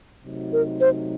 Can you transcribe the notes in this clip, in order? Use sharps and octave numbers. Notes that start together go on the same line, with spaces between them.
C3 F#3 A3 D#4 F#4
A#4
C5